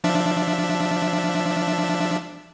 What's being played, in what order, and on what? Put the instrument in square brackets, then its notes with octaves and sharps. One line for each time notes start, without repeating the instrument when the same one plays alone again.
[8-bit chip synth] F3 D4 E5